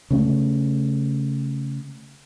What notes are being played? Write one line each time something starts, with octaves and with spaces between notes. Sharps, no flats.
C#3 A3